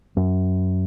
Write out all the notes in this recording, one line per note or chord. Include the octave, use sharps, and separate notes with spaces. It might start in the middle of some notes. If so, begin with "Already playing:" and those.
F#2